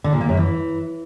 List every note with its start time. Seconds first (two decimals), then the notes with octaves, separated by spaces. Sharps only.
0.04 D3
0.13 A#2
0.21 A#3
0.29 F#2
0.37 E3